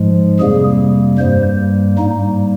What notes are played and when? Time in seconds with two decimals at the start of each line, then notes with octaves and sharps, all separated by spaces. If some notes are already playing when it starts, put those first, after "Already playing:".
Already playing: G#2 F3 G#3
0.40 F2 C3 G3 A#3 G#4
1.19 G2 G3 A#3 C5
1.98 G#2 G3 A#3 D#4